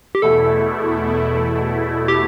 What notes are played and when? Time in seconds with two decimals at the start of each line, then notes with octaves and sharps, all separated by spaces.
0.15 G4
0.22 E2 B2 A3 E4 A4
2.08 G4